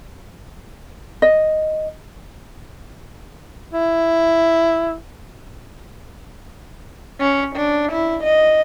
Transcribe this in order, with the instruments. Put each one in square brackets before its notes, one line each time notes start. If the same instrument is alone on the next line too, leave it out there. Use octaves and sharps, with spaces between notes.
[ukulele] D#5
[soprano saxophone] E4
[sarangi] C#4
D4
E4
D#5